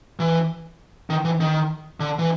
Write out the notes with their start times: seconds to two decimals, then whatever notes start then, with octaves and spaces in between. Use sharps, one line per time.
0.20 E3
1.10 D#3
1.25 E3
1.40 D#3
2.00 D3
2.19 E3